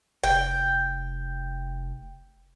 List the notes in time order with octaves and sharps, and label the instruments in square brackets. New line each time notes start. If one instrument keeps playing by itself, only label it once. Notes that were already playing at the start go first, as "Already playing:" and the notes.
[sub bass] F1 [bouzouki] G5